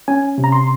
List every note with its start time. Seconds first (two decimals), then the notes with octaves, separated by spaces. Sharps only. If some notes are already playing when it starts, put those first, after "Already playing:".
0.08 C#4 G#5
0.38 C3
0.44 A#5
0.52 C6